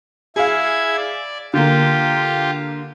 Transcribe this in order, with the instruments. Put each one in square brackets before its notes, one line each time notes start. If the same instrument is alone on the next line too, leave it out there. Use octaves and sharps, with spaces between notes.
[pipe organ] E4 G#6 [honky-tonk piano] G#4 F5
[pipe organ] D5
[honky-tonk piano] D3 A#3 [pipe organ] F4 G4